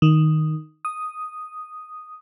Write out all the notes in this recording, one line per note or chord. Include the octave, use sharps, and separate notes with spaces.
D#3
D#6